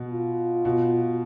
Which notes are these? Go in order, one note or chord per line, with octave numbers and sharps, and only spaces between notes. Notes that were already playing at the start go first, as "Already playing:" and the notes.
Already playing: B2
F4
B2